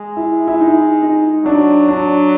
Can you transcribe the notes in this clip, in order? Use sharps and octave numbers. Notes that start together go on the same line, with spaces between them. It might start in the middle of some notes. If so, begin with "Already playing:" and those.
Already playing: G#3
E4
E4
D#4
D#4
F#3 D4
D4